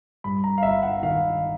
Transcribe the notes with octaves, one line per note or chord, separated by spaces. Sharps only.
G2 B5
A#5
F5
G1 E5
F#5
D#3 F5